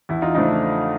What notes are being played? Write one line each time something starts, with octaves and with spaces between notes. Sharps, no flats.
E2 E4
D#4 F4
C#3 F3 A3 D4 D#4